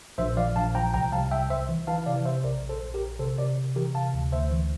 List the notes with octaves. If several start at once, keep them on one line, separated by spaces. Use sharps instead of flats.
A#1 C5 E5
F3 D5 F5
A#1 F5 A5
F3 G5 A#5
C2 G5 A#5
C2 F5 A5
C2 E5 G5
C2 C5 E5
E3
E3 F5 A5
C3 D5 F5
C3 C5 E5
A#1 A#4 D5
A#1
A4 C5
A#1
G4 A#4
A#1
C3 A4 C5
C3 A#4 D5
C3
E3 G4 A#4
C3 F5 A5
D2
D2 C5 E5
E3